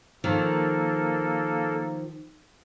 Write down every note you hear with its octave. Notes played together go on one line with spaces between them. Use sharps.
D#3 F3 A#3 A4